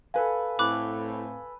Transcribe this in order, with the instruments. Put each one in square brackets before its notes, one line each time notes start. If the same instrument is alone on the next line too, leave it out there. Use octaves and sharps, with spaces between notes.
[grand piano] A4 B4 G#5 [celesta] F5
[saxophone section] A2 C4 [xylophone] B5 D6 F#6